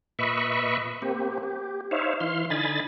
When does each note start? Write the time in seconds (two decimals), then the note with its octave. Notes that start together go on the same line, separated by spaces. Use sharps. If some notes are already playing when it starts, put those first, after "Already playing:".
0.19 A#2 B4 D#5 E5 B5 C#6
1.02 A#3 C4 G4
1.43 G4
1.91 D#4 C5 C#5 E5 F5
2.20 E3 F5 C6
2.50 D3 D#4 G#5 B5 A6